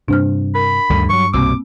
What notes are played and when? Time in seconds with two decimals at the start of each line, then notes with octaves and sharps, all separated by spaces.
0.08 G2 C3 D4 C5 F6
0.55 A#4 B5
0.90 D2 G2 D3 D#3
1.09 E3 F#3 C#6
1.34 C2 B2 A#3 C4 D6 E6